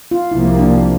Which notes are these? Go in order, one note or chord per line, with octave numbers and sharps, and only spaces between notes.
F4
C2 C3 F3 A#3 E4
D4